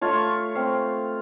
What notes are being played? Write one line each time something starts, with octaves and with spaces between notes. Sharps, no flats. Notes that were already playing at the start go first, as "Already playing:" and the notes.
A3 F4 C#5
C4 F5